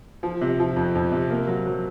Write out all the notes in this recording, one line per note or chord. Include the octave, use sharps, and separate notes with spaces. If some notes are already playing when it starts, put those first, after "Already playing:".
F3
C3
F3
F2
F2
C3
A#3
F#3
F#3